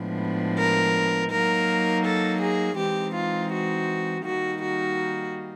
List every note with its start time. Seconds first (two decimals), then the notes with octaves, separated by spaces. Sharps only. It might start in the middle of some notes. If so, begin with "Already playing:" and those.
Already playing: A2 F3 G#3 B3 D4
0.58 A#4
1.32 F#3 A#3 D#4 A#4
2.05 A4
2.42 G#4
2.78 E3 G#3 C4 D#4 G4
3.15 F4
3.52 F#4
4.25 D#3 G3 A#3 D#4 F#4
4.62 F#4